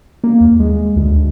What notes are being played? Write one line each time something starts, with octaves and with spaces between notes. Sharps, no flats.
A#3
D#2
G#3
D2